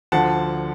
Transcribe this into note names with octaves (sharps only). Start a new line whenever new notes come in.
D2 D3 F3 F#5 A5